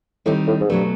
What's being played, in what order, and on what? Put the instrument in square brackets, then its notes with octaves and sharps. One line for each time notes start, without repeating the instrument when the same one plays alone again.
[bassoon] A2 [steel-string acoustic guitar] D#3 G3 C4 D#4
[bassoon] A2
G#2
[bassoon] G2 [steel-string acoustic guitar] B2 F#3 A3